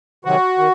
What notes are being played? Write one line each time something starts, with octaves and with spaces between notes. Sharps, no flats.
C3 D#3 F#3 F#4
D#3